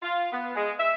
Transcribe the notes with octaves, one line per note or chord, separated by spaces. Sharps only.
F4
B3
G#3
E5